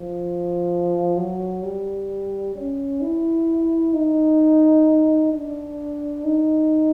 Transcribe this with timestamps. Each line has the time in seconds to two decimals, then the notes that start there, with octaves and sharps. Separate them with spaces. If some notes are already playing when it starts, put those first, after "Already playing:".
Already playing: F3
1.17 F#3
1.63 G3
2.55 C#4
3.01 E4
3.94 D#4
5.32 D4
6.24 D#4